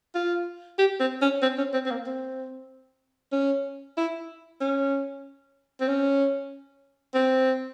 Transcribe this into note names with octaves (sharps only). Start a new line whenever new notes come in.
F4
G4
C4
C#4
C4
C#4
C4
C4
A#3
C4
C#4
E4
C#4
C4
C#4
C4